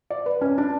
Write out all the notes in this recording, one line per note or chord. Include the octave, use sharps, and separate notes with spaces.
D5
B4
C#4
D4